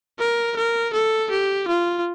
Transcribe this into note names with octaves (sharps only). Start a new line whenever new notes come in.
A#4
A#4
A4
G4
F4